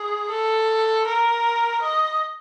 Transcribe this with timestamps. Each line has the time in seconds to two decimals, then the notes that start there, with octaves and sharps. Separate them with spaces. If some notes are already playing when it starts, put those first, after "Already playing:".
Already playing: G#4
0.30 A4
1.07 A#4
1.82 D#5